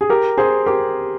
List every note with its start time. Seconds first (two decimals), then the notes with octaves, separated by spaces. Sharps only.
0.01 G#4
0.09 G4 A#4
0.37 G#4 C5
0.66 G4 A#4